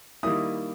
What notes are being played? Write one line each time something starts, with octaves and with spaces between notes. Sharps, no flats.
D#3 G3 A#3 E4 D#6